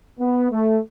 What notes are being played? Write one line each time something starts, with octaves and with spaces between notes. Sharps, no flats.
B3
A3